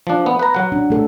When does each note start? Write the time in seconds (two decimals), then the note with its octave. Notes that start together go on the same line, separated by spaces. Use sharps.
0.07 F3 D4
0.26 B3
0.39 B4 A#5
0.55 F#3 F#5
0.72 D4
0.90 A3 A4